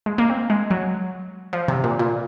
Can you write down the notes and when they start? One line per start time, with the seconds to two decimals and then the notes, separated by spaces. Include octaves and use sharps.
0.06 G#3
0.18 A#3
0.29 C4
0.50 G#3
0.71 F#3
1.53 F3
1.68 C3
1.84 A#2
1.99 A#2